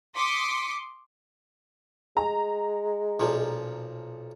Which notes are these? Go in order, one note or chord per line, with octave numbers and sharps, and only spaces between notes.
C6 D6 D#6 B6 C#7
G#3 A#5
B1 A#2 F3